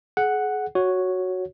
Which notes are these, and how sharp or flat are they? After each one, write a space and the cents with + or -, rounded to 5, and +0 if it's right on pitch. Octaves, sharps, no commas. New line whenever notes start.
G#4 +35 F#5 +0
F#4 +0 C#5 +0